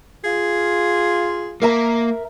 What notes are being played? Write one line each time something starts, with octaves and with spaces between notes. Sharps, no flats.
F4 G#4
A#3 A#4 E5 A#5